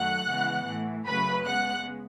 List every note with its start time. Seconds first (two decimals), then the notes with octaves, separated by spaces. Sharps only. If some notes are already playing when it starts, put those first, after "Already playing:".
Already playing: F#2 D#3 F#3 A3 F#5 F#6
0.27 C#3 E3 G#3 B3
0.67 A2 E3 A3
1.07 F#2 C#3 F#3 A3 B4 B5
1.47 C#3 G#3 B3 F#5 F#6